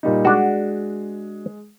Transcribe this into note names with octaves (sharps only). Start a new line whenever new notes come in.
A#2 G3 D#4
G#3 D4 F#4